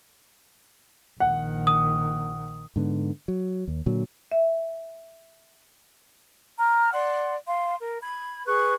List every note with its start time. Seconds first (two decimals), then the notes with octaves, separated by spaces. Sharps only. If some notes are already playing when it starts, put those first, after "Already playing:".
1.20 A#1 D#3 F#5
1.67 D#6
2.76 G#2 D3 B3
3.28 F#3
3.68 D#2
3.86 A#2 D3 F#3
4.31 E5
6.59 A#5 F6
6.93 D5 F#5 C6
7.48 F5 C6
7.81 A#4
8.02 B5 G#6
8.47 G#4 B4 C#6 F#6